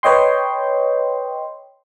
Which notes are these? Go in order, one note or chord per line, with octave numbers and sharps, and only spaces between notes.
B4 C#5 D#5 G5 C6